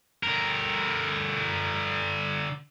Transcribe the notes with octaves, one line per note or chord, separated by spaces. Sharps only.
D3 A#4